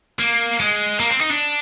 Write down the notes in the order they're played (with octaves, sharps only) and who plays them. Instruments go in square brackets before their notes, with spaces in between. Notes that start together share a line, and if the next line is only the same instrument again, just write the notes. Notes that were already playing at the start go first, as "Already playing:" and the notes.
[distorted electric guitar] A#3
G#3
A#3
C4
D#4
D4